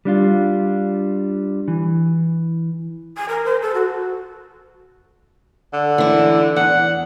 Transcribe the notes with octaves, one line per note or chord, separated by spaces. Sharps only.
G3 D4 F4
E3
G#5
A#4
C5
A4
F#4
D3
E3 E4
E2 F#5